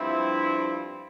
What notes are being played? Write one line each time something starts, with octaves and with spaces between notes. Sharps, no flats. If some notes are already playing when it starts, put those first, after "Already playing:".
Already playing: G2 F3 C4 E4